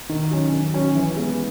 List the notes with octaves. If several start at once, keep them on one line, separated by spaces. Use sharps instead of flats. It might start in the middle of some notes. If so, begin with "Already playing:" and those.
D#3
F#3 C#4 F#4
D#3
F#3 C#4
E3
G#3 B3 E4